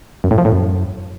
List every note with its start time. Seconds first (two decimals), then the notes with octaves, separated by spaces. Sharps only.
0.24 F#2
0.31 A2
0.38 F3
0.45 A2
0.52 F#2